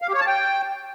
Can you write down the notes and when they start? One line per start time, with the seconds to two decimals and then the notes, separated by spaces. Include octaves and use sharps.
0.02 F5
0.08 G4
0.15 C#5
0.21 A5
0.27 G5